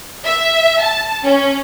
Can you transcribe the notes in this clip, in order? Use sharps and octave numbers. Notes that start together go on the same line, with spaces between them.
E5
A5
C#4